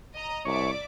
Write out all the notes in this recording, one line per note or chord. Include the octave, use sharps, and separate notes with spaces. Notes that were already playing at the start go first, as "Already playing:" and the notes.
D#5 A#5
C2 C#5 D5 E5 D6